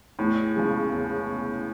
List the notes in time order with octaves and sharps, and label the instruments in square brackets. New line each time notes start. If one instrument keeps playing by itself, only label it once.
[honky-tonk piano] E2 [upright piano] A2
[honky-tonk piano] C#3 F3 G#3 C#4
E2